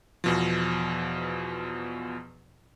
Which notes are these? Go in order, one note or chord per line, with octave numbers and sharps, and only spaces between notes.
E2 B2 F3